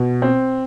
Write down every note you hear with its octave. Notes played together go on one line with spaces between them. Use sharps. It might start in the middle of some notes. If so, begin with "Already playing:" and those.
Already playing: B2
C4